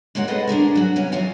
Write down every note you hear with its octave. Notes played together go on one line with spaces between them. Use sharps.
G#3 A#3 F#4 C#5 F#5
C4 G#4 A4 B4 D#5 F#5
C#4 D4 G#4 A#4
F#3 F#4
C3 B3 C#4 A#4
F2 F#3 F4 G#5